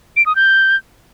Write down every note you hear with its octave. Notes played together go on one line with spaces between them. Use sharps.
D7
D#6
G6